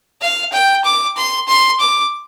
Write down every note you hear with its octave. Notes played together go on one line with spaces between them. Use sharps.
F5
G5
D6
C6
C6
D6